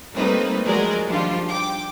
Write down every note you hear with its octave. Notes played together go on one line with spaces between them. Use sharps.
G3 A3 A#3 C4 D#4 B4
F3 F#3 G#3 A#4 D5
D#3 F3 G3 D4 F4
G5 D6